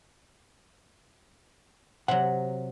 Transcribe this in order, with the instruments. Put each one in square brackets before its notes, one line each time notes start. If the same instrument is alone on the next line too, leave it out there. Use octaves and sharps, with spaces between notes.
[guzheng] C3 F#3 [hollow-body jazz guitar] F#5